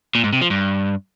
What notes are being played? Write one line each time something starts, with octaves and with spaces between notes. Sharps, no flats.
A#2
G#2
C3
F3
G2